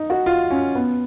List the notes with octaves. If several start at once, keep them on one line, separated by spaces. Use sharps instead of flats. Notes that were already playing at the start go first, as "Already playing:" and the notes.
Already playing: D#4
F#4
F4
C#4
B3